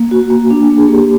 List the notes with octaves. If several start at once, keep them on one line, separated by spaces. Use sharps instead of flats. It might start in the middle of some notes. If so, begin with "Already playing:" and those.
Already playing: A#3
F#4
A#3
D4
A#3
G#4
A#3 G4